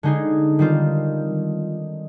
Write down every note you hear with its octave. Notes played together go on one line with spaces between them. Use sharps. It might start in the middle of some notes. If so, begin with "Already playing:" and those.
D3 G#3 D#4 G#4
D#3 G3 C4 F4